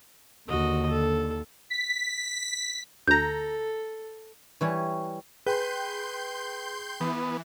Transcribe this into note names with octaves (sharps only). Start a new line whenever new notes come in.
D#2 D3 F#4 D#5
A4
B6
D2 A4 A#5 G6
E3 G3 C#5
G#4 B4 G5 C6 G6
E3 B3